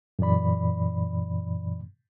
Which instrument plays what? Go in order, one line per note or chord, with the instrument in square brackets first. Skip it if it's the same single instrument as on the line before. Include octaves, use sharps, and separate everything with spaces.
[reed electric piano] F#2 A#2 E3 D5 B5